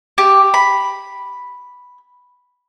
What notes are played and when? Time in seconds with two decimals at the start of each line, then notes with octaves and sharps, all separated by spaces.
0.18 G4
0.54 B5